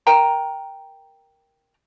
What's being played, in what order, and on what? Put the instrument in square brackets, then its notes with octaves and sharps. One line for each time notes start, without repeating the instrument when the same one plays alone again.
[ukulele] A#4 G5 A#5